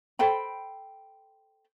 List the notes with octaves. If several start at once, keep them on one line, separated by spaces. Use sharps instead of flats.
A4 C5 G5 B5